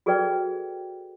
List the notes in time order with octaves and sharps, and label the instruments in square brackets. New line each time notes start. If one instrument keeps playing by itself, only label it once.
[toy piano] F#4 G#4 A4 B4 D5 G5